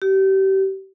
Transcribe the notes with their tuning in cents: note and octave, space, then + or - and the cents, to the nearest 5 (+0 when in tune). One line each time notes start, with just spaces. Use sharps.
G4 -30